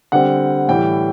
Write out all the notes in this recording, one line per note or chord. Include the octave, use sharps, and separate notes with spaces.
D3 G3 C4 F#5
A2 E3 G3 G5